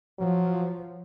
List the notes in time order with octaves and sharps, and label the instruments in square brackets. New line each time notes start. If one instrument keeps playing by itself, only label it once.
[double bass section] F3 [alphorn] F#3